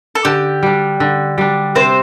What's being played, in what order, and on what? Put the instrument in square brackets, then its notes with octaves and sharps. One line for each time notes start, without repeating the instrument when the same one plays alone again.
[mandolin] A4
[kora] D3 [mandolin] G4
[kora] G3 D4
D3
G3 D4
[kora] C3 [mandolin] C4 C5